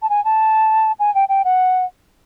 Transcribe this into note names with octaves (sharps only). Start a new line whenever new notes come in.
A5
G#5
A5
G#5
G5
G5
F#5